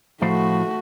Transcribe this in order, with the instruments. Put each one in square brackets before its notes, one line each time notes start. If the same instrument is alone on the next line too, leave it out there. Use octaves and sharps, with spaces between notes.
[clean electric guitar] A2 F3 C5 [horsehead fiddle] A3 F#4